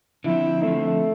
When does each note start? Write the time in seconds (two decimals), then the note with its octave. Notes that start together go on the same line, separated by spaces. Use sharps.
0.24 D3 F3 C4 E4
0.63 D3 F3 A3 C4